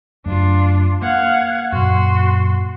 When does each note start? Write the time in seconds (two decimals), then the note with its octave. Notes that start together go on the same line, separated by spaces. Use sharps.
0.26 F#1 F#2 A3 D4 F4
1.02 A#3 F5 F#5 G#6
1.72 F#2 A#2 F#4 C6